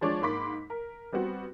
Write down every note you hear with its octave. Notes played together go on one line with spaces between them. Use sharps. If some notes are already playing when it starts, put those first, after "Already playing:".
F3 G#3 D4 C#5 D5
G#2 A#3 B5 C6 D6 B6
A#4
G3 B3 C4 F#4